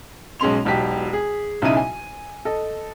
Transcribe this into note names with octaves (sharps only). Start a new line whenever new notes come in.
B1 G#3 C#4 C6 F7
E1 B1 G4 B6
G#4
B1 C#3 F#3 D#4 E4 D#7
G#5
A4 D#5